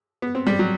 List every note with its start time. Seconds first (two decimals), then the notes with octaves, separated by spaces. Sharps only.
0.22 B3
0.35 C4
0.47 G3
0.59 F#3